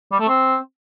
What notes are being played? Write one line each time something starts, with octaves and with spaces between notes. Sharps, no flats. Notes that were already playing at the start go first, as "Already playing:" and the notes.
G3
A3
C4